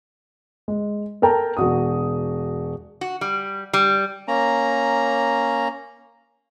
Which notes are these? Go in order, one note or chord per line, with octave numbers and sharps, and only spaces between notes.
G#3
A4 A#4 G5 A5 A#5
E1 F#4 D#6
F#4
G3
G3
A#3 C#4 A#5